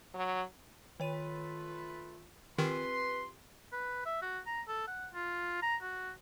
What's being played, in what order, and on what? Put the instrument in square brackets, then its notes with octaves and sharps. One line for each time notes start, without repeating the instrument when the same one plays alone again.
[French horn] F#3
[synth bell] D#3 C#5 D#7 [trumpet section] A3 B4 [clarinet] F4
[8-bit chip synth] D#3 [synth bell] C4 F4 G4 [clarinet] B4 [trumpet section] C6
[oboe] B4
E5
F#4
A#5
A4
F#5
F4
A#5
F#4